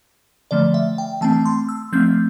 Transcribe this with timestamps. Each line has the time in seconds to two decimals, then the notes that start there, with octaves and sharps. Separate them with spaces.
0.51 D3 F3 A3 D5
0.74 E5
0.98 G5
1.21 E3 A3 C4 A5
1.45 C6
1.69 E6
1.92 F3 A3 C4 G6